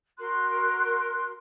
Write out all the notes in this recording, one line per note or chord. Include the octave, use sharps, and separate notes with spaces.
F#4 A#4 C6 F#6